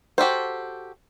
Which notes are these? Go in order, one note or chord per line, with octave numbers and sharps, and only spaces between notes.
F#4 G4 A4 C5